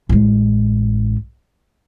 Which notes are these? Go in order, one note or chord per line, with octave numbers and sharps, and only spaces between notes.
A1 G#3